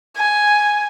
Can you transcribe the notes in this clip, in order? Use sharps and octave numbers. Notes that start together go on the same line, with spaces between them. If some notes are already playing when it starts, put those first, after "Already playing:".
G#5